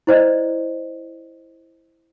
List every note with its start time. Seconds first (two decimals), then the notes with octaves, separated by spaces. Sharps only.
0.07 E4 C5 D5 D#5